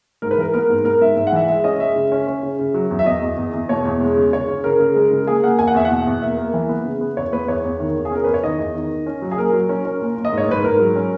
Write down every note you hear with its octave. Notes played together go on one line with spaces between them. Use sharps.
G#2 A#4
B4
E3 A#4
B3 A#4
G#2
B3 A#4
G#2 E5
G#2 E5
F#5
E3 E5
G#3 E5
C#4 D#5
G#3 E5
C#3
C#4
C#4
C#3
C#3
F#3
E2
E5
E2 D#5
E2
E2
E2
B2 C#5
E2
G#3
C#3
C#3 C#5
C#3
C#3 A#4
C#3
G#3
C#3
A#3 G#4
A#3 F#5
E2 G#5
F#5
E2 E5
F#5
B2
E2
A#3 E5
A#3
E3
B3
C#3
B3
E2 C#5
B3 B4
E2 C#5
E2
D#3
E2
G#4
C#4 A#4
E2 B4
C#5
D#3 D#5
E2
D#3
D#3
C#4
F#3
G#4
A#2 A#4
F#3
C#4
C#4
A#2
A#2
D#5
G#2
C#5
G#2 B4
G#2 A#4
F#3
C#4